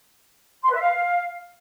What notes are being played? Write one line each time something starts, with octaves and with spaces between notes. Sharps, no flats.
C6
B4
E5
F5